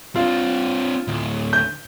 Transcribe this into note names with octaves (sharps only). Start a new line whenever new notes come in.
C4 D4 F4
D2 A2
G6